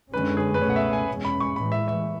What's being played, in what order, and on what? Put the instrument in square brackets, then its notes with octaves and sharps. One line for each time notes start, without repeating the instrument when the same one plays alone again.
[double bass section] F#2 D3 G#3 C#4 [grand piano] B4
[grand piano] G#4
B4
[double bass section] C#2 B2 A3 C#4 [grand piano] C#5
[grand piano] F#5
E5
G#5
[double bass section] E2 B2 G#3 C#4
[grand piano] B5
C#6
[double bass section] A2 E3 G#3 [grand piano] B5
[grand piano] E5
E5